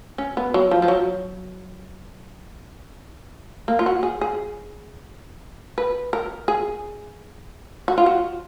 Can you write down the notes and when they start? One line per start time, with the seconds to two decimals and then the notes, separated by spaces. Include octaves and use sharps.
0.18 C#4
0.37 B3
0.54 F#3
0.71 F3
0.82 F3
0.88 F#3
3.68 A#3
3.79 F4
3.86 F#4
4.03 G#4
4.21 G#4
5.78 B4
6.13 A#4
6.48 G#4
7.88 F#4
7.98 F4
8.06 F#4